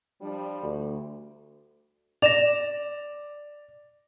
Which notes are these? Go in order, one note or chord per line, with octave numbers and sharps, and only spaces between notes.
F3 G3 D4
D2
D5 A#6 E7 F7